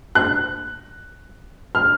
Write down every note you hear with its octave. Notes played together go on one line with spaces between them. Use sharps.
F#6
F6